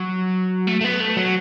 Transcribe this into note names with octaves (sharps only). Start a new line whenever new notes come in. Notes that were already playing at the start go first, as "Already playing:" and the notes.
Already playing: F#3
A3
A3
B3
A3
F#3